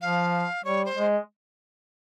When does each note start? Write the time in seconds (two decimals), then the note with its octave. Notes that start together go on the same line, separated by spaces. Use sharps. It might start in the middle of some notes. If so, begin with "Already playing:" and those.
0.01 F3 F5
0.65 G3 C#5
0.85 C5
0.95 G#3